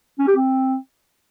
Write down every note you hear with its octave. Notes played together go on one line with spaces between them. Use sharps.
C#4
G4
C4